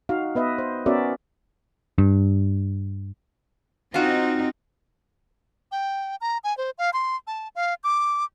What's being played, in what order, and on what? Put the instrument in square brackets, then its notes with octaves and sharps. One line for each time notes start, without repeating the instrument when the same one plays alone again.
[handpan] D#4 F#4 F5
B3 B4 D#5 E5
C5
B3 C#4 F#4 A#4 D5 E5
[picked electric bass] G2
[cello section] C4 D#4 [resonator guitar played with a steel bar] F4 F#4
[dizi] G5
A#5
G#5
C5
F5
C6
A5
F5
D6